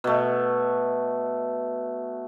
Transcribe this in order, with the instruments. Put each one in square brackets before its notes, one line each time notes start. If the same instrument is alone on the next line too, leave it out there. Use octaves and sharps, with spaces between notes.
[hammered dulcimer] B2 A3